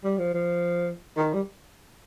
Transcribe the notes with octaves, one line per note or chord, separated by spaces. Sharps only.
G3
F3
F3
D#3
G3